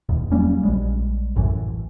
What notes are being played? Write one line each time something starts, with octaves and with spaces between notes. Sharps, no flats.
E1 E2 A#2 D#3
F#3 G3 A#3 C#4
A#1 G3 G#3
A1 F#2 A2 E3